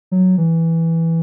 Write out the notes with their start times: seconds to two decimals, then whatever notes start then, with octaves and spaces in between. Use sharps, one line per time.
0.12 F#3
0.38 E3